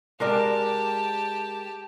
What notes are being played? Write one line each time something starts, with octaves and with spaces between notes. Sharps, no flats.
G#3 G4 A#4 D5 A5